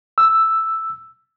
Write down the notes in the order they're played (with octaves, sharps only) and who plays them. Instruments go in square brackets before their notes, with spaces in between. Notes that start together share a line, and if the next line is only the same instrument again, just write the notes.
[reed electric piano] E6